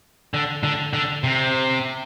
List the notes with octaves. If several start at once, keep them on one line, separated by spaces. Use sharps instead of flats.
D3
D3
D3
C3